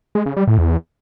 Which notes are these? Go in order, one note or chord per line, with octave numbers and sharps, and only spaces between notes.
G#3
C#3
G3
A2
E2